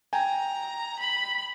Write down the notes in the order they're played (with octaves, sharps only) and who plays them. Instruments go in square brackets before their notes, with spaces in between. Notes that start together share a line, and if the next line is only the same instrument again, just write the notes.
[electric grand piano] G5 G#5 [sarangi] A#5
[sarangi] B5